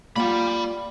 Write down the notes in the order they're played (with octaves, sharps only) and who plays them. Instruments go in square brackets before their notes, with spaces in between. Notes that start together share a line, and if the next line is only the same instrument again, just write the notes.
[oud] G3 [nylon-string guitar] A#3 F4 F#5 [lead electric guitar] D5 B5